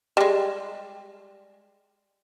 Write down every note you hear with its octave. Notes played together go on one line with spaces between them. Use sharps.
G3 G#3